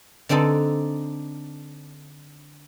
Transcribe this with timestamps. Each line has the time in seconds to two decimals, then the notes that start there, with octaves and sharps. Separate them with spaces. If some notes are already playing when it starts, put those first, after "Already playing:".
0.29 D3 C4 D4 D#4 A4